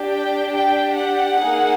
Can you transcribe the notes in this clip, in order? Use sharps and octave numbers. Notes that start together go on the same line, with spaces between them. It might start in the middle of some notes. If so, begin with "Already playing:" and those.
Already playing: D4 G4
G5
G5
F#5
A#3 D#4 G#4